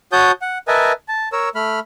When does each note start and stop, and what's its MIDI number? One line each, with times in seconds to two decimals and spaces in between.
0.12 0.32 66
0.12 0.32 73
0.12 0.32 81
0.12 0.32 87
0.12 0.32 91
0.42 0.58 78
0.68 0.92 70
0.68 0.92 71
0.68 0.92 75
0.68 0.92 76
0.68 0.92 80
0.68 0.92 81
1.08 1.29 81
1.32 1.49 70
1.32 1.49 73
1.32 1.49 88
1.55 1.80 57
1.55 1.80 83
1.55 1.80 89